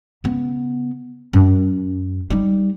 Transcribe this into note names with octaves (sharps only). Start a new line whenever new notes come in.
C#3 B3
F#2
G3 D#4